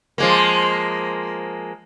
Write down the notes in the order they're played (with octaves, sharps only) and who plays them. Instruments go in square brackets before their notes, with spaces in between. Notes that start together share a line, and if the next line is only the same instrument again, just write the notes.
[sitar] F3 G#3 A#3